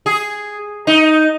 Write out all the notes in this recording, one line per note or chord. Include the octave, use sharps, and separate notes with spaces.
G#4
D#4